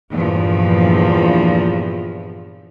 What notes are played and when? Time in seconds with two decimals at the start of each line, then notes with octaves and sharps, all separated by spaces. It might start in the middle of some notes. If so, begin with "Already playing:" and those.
0.12 E2 G2 A#2 F3